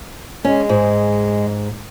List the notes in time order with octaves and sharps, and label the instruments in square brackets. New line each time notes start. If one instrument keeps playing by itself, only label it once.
[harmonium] G#3 [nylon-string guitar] C#4
[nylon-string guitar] G#2